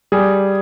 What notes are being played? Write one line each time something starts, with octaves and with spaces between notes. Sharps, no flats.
G3 G#4